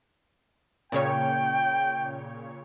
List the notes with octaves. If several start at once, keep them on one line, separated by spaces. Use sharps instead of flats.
A#2 C#3 C#5 G5